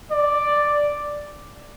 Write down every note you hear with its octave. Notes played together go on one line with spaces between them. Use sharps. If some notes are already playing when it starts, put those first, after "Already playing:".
D5